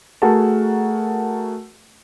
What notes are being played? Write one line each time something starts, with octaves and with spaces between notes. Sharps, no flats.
A3 F#4 G#4 A#4 F#5 A5